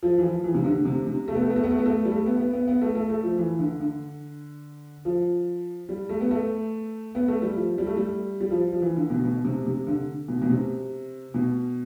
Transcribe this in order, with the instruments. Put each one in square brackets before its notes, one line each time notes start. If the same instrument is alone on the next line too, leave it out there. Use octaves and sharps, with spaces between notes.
[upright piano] F3
E3
F3
E3
C3
D3
D3
C3
C3
A3
B3
A3
B3
A3
B3
A3
B3
A3
G3
A3
B3
B3
B3
B3
A3
A3
A3
F3
E3
D3
D3
F3
G3
A3
B3
A3
B3
A3
G3
F3
G3
A3
G3
G3
F3
F3
E3
D3
B2
B2
C3
C3
D3
B2
B2
C3
B2